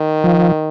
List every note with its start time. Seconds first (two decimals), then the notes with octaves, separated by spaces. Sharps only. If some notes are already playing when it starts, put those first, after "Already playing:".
Already playing: D#3
0.24 F3